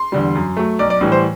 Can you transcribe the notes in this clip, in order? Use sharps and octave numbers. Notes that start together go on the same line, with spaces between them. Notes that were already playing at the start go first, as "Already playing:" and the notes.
Already playing: C6
E2 D3 G3
F#2
F#3 A3
B1 D5
D5
A2 E3 G3
C5